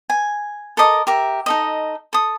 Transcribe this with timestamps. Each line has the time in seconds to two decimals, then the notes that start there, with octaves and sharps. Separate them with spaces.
0.10 G#5
0.77 A4 A#4 D#5 D6
1.07 G4 A#4 E5
1.46 D#4 A4 D#5
2.13 A4 D#6